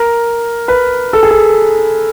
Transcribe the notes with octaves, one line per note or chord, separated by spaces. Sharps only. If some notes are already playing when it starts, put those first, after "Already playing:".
Already playing: A#4
B4
A4
G#4
A4